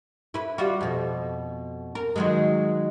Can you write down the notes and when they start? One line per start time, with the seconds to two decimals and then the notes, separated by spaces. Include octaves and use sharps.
0.34 E4 B4
0.58 G3 F4 F#4
0.81 F2 B2
1.95 A#4
2.16 D#3 F#3 G#3